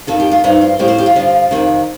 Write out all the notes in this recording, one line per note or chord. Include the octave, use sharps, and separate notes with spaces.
F2 D#3 A4
G4
F4
G2 F3 D#4
F4
A2 F3 G4
C5
G4
F4
G2 D3 F3
F2 C3 D#3